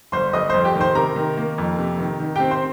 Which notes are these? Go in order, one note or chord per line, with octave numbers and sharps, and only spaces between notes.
G1 C5 C6
G1 D#5 D#6
F2 C5 C6
G4 G5
D#3
C5 C6
C3 A#4 A#5
D#3
A#3
F2
C3
D#3
D#3
C4 G4 G5
C5 C6